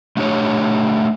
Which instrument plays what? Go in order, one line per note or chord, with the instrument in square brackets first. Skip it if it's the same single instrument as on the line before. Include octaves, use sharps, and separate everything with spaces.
[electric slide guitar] A3 D4 G4 C#5